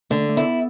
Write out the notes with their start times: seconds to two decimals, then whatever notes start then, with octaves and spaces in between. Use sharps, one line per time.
0.10 D3 A3
0.29 A3
0.36 B3 E4